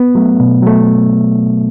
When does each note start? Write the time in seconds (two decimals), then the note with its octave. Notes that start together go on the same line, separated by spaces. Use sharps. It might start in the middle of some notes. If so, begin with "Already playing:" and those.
Already playing: B3
0.15 F#3 A3
0.40 B2
0.62 F#3 A3